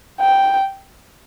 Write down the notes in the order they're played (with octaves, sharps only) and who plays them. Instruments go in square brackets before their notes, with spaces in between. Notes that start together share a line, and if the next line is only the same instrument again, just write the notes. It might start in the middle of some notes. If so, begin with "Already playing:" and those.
[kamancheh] G5